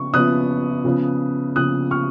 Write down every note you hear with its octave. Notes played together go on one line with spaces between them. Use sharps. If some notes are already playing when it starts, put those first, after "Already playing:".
Already playing: C#3 F3 B3 C#6
C#3 F3 B3 D#6 F#6
C#3 F3 B3
C#3 F3 B3 D#6 F#6
C#6 F6